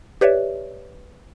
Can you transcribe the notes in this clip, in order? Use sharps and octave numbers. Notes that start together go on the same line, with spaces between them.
G4 B4 C#5 D5 E5